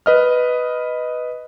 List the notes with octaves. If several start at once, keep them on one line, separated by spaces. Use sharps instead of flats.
B4 D#5 F6